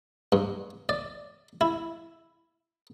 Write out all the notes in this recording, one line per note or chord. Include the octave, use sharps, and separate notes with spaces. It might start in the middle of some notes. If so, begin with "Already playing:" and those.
G2
D5
E4